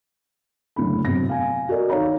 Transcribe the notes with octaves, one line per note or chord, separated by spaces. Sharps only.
F#1 A2 D3 B5
C3 F#3 A#6
F5 G#5
F#4 A4 A#4 D5 D#5
D#3 D#4 C#5 F5 A#5